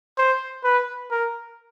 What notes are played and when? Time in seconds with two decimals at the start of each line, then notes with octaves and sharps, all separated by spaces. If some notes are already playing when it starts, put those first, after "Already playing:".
0.18 C5
0.64 B4
1.11 A#4